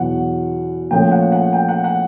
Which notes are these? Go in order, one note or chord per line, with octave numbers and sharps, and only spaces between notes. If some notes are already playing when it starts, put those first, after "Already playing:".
Already playing: E2 B2 F#3 F#5
A#2 F3 A3 C#4 G5
F#5
F#5
G5
F#5
F#5